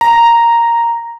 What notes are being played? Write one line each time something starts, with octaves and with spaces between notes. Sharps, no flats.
A#5